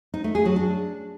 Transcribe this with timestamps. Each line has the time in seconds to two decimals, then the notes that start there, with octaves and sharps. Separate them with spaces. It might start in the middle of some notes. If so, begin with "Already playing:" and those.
0.14 D#4
0.24 A3
0.35 G#4
0.45 F#3
0.56 D4